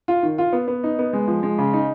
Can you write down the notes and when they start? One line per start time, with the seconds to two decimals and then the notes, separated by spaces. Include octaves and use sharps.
0.08 F4
0.23 D#3
0.38 F4
0.53 B3
0.68 B3
0.84 D#4
0.99 B3
1.13 G#3
1.28 F3
1.43 G#3
1.59 C#3
1.73 D#4